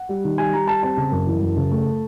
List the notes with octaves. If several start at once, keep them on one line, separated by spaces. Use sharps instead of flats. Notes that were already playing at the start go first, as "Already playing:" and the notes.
Already playing: F#5
G3
D#3
G3 G#5
G3 A#5
G3 A5
C4 A5
C#3
F#2
E3
F#2
C#3
A3